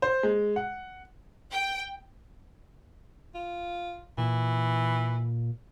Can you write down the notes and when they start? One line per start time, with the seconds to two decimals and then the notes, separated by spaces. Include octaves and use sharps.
0.02 C5
0.23 G#3
0.56 F#5
1.52 G5
3.35 F4
4.18 A#2 E3